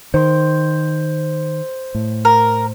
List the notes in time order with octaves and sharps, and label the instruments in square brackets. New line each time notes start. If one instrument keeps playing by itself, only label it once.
[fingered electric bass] D#3 [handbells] C5 C6
[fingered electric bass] A2
[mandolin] A#4